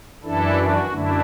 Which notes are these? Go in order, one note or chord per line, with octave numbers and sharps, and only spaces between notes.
F#2 E3 D4 E4 A4
F#4
F#2 D3 A3 D4 E4